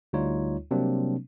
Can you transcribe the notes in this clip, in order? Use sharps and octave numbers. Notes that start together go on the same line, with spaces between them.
D2 G3 D#4 F4 C#5
C3 F#3 G3 A#3 C4 D4